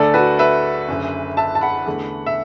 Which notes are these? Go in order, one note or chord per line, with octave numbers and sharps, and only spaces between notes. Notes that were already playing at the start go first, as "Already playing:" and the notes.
Already playing: D2 D3 A3 A4 D5
F#4 B4
B4 E5
F#1 F#2 D3
E5 A5
A5
F#5 B5
E2 D3 A3
E5